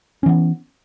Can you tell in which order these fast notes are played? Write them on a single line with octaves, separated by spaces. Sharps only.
C#4 E3 B3